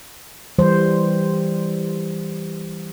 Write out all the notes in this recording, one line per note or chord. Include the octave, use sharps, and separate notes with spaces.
E3 G3 C5